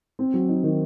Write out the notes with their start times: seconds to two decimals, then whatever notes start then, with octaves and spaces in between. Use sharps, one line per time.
0.19 C4
0.34 F#3
0.48 D#4
0.63 D#3